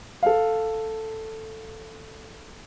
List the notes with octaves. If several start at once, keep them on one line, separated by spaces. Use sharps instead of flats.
A4 F5